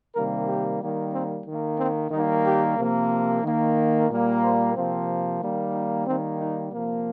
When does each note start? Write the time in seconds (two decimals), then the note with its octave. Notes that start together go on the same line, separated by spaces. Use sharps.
0.14 C3 D#3 G3 A#3 A#4
0.47 G4
0.80 D#3 G3 A#3
1.13 C4
1.46 D#3 A#3
1.79 C4
2.11 D#3 G3 A#3 D#4
2.45 G4
2.78 C3 F3 A#3
3.43 D#3 A#3
4.09 A#2 G3 A#3
4.42 C5
4.74 C3 F3 A#3 C4
5.41 D#3 G3 A#3
5.74 D#4
6.06 D#3 G3 A#3 C4
6.39 D#4
6.72 C3 F3 A#3